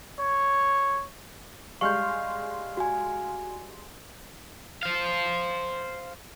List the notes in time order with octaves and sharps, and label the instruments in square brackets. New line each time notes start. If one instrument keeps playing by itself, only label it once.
[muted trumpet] C#5
[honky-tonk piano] G3 G#3 [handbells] F5 F6 [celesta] C#6 G6
[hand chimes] F#4 G#5
[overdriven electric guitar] C5 F5